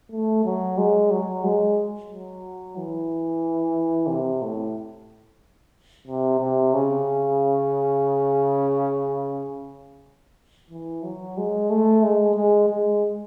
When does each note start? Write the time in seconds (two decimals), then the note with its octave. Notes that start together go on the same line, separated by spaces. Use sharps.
0.12 A3
0.45 F#3
0.78 G#3
1.11 F#3
1.44 G#3
2.10 F#3
2.77 E3
4.08 C3
4.42 A2
6.07 C3
6.40 C3
6.74 C#3
10.70 E3
11.03 F#3
11.37 G#3
11.70 A3
12.03 G#3
12.36 G#3
12.69 G#3